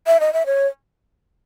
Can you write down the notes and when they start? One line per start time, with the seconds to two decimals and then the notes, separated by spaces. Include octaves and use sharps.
0.07 E5
0.20 D#5
0.33 E5
0.46 C#5